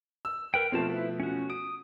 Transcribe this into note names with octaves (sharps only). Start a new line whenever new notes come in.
E6
A#4 B4 G5
B2 F3 A3 C4 F4 A5
E4 B4
C#4 F#4
D#6 D7